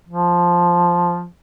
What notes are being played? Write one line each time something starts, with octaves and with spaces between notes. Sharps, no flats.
F3